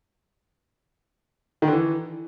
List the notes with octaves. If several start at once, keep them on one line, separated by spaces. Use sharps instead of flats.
D#3
D3
E3